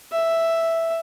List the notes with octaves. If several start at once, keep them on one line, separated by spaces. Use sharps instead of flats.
E5